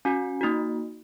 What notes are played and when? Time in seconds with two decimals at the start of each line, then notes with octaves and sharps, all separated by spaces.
0.05 C#4 F#4 G#5
0.41 A#3 D#4 F#4